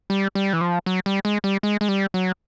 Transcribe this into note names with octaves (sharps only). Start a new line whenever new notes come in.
G3
G3
E3
F3
F#3
G3
G#3
G3
G#3
G#3
G3
F#3